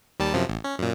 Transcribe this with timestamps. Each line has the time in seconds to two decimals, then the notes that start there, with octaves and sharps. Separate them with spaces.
0.20 D#2 G3 A5
0.34 F#2 C3 F3
0.49 A1
0.64 C#4
0.79 F#2 A#2